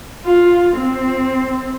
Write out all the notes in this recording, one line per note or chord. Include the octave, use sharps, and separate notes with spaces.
F4
C4